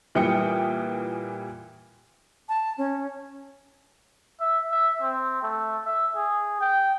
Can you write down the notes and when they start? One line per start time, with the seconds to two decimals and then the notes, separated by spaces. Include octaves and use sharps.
0.15 A#2 E3 G3 G5 D#6 C#7
2.49 A5
2.78 C#4
4.40 E5
4.72 E5
5.02 C4
5.43 A3
5.85 E5
6.16 G#4
6.61 G5